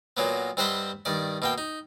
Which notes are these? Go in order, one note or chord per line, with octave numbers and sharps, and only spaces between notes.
A#2 F#3 A#3 B3
G2 C4 C5 D#5 F#5 B5
G2 D#3 D5
B2 A#3 G5
D#4